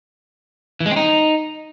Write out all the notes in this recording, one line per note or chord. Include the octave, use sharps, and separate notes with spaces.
E3
G#3
C4
D#4